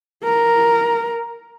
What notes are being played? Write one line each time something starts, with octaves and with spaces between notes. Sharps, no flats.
A#4